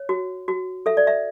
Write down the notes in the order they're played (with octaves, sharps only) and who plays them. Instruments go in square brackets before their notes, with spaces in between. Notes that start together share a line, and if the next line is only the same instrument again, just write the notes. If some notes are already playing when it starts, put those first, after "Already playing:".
Already playing: [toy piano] C#5
F#4
F#4
A4 E5
D5
E5